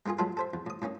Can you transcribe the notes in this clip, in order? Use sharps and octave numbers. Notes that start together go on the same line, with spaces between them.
G#3 A#3 D#4 F4 G#4
F#3 G#3 A3 F4 A4 B4
A4 C5 E5
E2
A2 D#6
A2 A#3 C#4 D#4